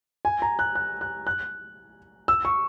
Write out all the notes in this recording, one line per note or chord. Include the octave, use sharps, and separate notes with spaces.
G#5
A#5
F#6
F#6
F#6
F#6
E6
C#6